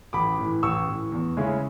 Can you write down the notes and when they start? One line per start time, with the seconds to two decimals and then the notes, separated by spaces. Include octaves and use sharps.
0.13 A1 B5 D6
0.39 A2 E3
0.63 A1 C#6 E6
0.88 A2 E3
1.12 E2
1.37 C#3 G#3 C#4 E4